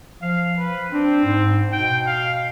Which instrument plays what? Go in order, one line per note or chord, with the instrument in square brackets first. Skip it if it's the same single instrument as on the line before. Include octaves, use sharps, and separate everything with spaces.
[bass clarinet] F3 [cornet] F5
[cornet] B4
[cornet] C4 [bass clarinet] D4
[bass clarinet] G#2
[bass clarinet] B2 [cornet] G5
[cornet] F5